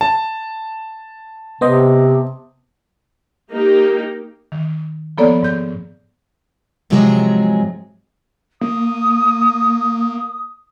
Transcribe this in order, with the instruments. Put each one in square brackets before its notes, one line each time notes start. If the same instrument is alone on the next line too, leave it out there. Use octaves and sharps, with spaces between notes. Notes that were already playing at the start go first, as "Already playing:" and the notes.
[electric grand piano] A5
[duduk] C3 [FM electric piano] B3 C5 D#5
[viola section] A#3 D#4 G4
[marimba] D#3
F3 A#3 B3 A4 C#5 D5
G#2 G6
[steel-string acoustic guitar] G#2 C3 F3 F#3 G#3 G#4
[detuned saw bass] A#3 [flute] D#6